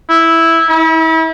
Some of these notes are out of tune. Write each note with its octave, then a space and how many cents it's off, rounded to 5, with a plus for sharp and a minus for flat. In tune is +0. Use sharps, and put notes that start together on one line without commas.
E4 -5
E4 -35